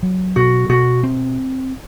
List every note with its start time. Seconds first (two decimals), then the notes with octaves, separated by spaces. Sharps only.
0.03 F#3
0.36 B2 F#4
0.69 B2 F#4
1.03 C4